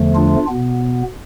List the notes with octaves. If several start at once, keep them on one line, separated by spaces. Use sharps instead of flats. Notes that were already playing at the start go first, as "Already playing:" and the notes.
Already playing: E2 D3 F3 A3
D4 F4
B2 B3